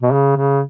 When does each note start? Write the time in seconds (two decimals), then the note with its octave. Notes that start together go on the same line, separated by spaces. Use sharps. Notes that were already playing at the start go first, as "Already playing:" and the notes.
0.02 B2
0.12 C#3
0.36 C#3